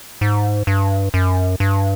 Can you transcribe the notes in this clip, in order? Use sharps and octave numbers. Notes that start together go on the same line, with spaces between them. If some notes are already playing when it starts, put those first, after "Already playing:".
G#2
G2
F#2
G2